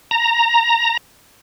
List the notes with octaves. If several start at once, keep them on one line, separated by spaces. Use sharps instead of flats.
A#5